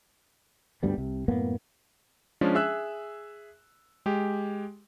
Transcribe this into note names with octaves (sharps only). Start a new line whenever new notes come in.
D2 G2 G3 B3
C2 C3
F#2 A2 A#3 B3
F3 G#3 C#4 D4
G#4 E5 E6 F#6
G#3 G4